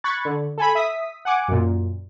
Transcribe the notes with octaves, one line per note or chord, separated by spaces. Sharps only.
B5 C#6 F#6 G#6 A6
D3
A4 G#5 B5
E5 D#6 B6
F#5 G#5 D6
F#2 A#2